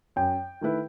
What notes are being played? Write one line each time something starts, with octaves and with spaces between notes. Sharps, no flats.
F#2 G5
D#3 A3 E4 B4